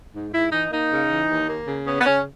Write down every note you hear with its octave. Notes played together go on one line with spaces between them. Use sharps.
G#2
G#2 E4
E3 D#4
A#3 D#4
C#3
E3
D#2
A#3
C#3
B3 C#4
B3
C#3 C#4